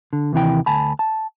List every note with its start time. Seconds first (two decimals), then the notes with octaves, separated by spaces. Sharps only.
0.13 D3
0.33 D#2 C3 E3 G5
0.66 D2 G#5 A5 B5
0.99 A5